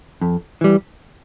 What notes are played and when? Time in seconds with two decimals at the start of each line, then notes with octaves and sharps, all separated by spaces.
0.21 F2
0.61 E3 G3